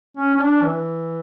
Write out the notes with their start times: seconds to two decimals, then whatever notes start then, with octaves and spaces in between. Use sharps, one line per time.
0.17 C#4
0.34 C#4
0.40 D4
0.62 E3